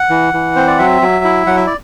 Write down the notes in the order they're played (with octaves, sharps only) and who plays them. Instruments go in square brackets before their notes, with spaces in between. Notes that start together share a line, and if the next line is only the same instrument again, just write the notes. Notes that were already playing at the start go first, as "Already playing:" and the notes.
Already playing: [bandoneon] F#5
E3
E3
C4 C5
D5
F#3 E5
F#3
E4
F#3 F#5
E5
D5